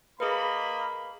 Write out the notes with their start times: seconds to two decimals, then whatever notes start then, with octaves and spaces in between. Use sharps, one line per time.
0.20 A#3 G#4 B4 D#5 B5